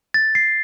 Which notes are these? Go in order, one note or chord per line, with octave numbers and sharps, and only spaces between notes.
A6
C7